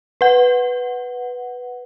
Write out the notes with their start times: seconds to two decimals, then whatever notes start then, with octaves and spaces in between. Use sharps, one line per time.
0.21 B4 F#5